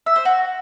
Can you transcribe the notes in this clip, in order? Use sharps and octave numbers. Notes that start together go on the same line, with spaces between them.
E5
C5
F#4